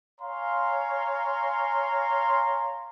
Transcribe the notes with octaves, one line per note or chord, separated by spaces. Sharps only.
C#5 F5 G#5 A#5 C6